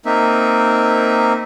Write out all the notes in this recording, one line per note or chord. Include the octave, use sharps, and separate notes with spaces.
A#3 C4 D#4 E5